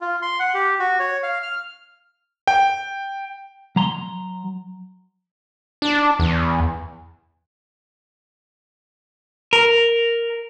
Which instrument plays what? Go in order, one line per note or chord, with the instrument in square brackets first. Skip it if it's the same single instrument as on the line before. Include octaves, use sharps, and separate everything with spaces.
[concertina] F4
C6
F#5
G4
F#4
C#5
F5
F6
[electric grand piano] G5
[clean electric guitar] F#3 A#5 C6
[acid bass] D4
E2
[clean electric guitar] A#4